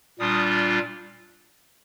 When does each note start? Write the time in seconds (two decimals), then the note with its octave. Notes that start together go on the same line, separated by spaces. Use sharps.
0.19 A#2 G3 D4 F4 D#6